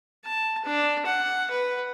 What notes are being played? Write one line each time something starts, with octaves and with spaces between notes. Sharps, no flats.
A5
D4
F#5
B4